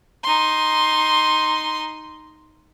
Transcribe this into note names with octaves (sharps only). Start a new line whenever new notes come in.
D#4 C6